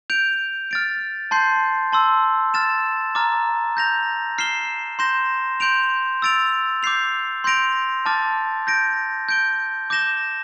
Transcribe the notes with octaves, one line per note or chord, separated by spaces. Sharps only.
G6 D7 F7
F6 A6 D7
A5 C6 G6 C7
A5 C6 E6
F6 A6 E7
A#5 D6 F6 A6
G6 A#6 F7
F6 C7 E7 G7
C6 G6 A#6 E7 G7
C6 G6 D7 F7
E6 A6 D7 F7
D6 G6 C7 F7
C6 G6 A#6 D7 F7
A5 D6 F6 A6
G6 A#6 D7
G6 D7 G7
D6 G6 A#6 E7 G7